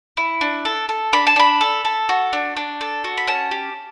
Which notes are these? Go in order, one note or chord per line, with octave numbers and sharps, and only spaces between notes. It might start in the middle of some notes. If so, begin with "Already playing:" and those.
E4
D4
A4
A4
D4 B5
A5
D4 B5
A4
A4
F#4
D4
D4
A4
F#4
B5
C#4 A5
G4